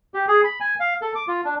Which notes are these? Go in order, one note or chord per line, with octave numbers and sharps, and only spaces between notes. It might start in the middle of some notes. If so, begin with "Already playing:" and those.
G4
G#4
B5
G#5
F5
A4
D6
F4
D4